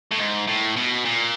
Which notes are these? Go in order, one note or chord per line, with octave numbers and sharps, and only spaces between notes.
A2
G#2
A2
B2
A#2